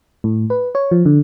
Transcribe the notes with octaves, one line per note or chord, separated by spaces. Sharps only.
A2
B4
C#5
F3
D3